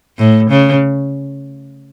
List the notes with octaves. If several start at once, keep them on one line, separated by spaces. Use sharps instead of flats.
A2
C#3